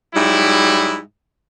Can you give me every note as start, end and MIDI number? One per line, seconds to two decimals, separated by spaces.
0.14 0.99 44
0.14 0.99 54
0.14 0.99 55
0.14 0.99 64